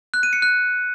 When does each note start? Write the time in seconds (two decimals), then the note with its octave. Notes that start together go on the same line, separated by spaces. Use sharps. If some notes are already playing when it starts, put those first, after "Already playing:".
0.14 F#6
0.23 D#7
0.33 C#7
0.42 F#6